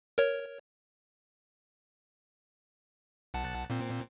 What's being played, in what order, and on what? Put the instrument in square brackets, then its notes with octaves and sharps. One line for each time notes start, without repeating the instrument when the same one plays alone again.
[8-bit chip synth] A#4 C#5
B1 F#5 A5
A#2 C4